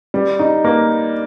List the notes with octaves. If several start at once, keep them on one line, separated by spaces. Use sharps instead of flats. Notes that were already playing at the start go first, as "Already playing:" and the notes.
G3
D#4
A#3